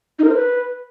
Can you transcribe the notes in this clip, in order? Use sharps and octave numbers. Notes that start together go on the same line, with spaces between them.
D#4
A#4
C5
B4